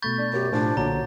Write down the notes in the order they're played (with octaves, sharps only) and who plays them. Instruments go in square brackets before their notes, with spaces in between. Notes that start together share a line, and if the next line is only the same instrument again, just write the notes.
[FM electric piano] B2 A3 B5 [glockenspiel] C#6 G6 A6
[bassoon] D4
[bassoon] F#2 [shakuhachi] G4
[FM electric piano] A2 G#5 [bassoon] F3 [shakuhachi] D4
[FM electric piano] B1 A#2 D3 [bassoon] F#3 [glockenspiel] A#5